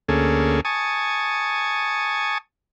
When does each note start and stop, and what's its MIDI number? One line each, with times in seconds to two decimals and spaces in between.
0.09 0.61 38
0.09 0.61 58
0.09 0.61 61
0.09 0.61 68
0.09 0.61 69
0.65 2.38 80
0.65 2.38 81
0.65 2.38 85
0.65 2.38 87